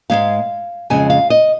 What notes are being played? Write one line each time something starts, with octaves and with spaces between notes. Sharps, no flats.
G#2 D#3 G#3 F5
F2 C#3 G#3 G#5
F5
D#5